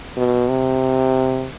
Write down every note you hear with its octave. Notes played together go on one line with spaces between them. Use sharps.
B2
C3